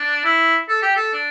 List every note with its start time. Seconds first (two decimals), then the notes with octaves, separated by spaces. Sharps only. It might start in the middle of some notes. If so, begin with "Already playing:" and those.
Already playing: D4
0.25 E4
0.69 A4
0.83 G4
0.96 A4
1.14 D4